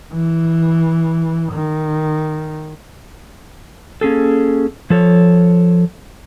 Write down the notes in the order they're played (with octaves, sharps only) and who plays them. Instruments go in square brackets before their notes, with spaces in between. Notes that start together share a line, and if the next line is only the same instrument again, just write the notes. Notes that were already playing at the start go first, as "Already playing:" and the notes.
[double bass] E3
D#3
[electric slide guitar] A#3 C#4 G#4 A4
F3 A4 C#5